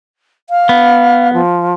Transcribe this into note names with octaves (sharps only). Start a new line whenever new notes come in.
F5
B3
F3